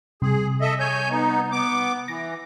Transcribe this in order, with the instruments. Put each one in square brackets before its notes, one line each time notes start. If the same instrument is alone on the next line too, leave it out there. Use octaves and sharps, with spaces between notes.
[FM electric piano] C3 G3 [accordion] G#4
[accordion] A4 D#5 E5
C#5 G#5 G6
B3 D#4
B3 D6
[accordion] E3 [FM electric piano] A#6